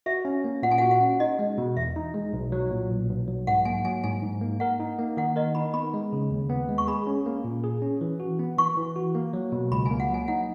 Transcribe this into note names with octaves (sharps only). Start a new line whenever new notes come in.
F#4 E5
C#4
A#3
A#2 F#5
G#5
F#4 F#5
F#5
C#4
D#4 D#5
G#3
B2
E2 E5
D#4
G#3
B1
F#3
A#2
B1
B1
F#3
G#2 F#5
A#3 G#5
F#3 G#5
G#2 G#5
G#2
A#3
A#4 F#5
D#4
A#3
D#3 F#5
A#4 D#5
D#4 B5
B3 B5
G#3
C#3
D#2
B3
G#3
C#6
G#4 B5
C#4
A#3
A#2
G#4
C#4
E3
F#4
B3
E3 C#6
E3
F#4
A#3
F#3
B2
C#2 B5
G#5
A#3
F#5
F#3 G#5
D#4 F#5